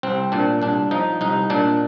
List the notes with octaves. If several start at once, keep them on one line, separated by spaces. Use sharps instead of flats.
C2 C4
A#2 D4
C2 D4
F3 D#4
C2 D#4
A#2 D4